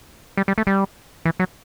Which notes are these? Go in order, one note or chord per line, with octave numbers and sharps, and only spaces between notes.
G3
G3
A3
G3
E3
F#3